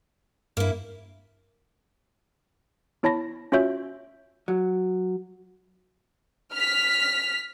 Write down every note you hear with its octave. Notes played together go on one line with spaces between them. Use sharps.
G2 A#3 E4
B3 E4 C#5 A5 B5 A#6
C#4 F4 F#4 C#5 E5 G6
F#3
F6 B6